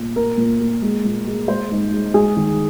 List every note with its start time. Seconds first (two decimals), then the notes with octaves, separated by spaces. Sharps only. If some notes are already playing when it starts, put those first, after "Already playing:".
Already playing: A#2
0.16 A#3 A#4
0.37 A#2
0.60 A#3
0.82 G#3
1.05 A#2
1.27 G#3
1.48 G#3 C5
1.71 G#2
1.93 G#3
2.14 G#3 G#4
2.37 D#3